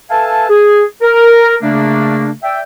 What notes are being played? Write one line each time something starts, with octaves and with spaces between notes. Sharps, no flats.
A4 B4 E5 F5 G#5 A5
G#4
A#4
C#3 A3 A#3 D4
D5 E5 G5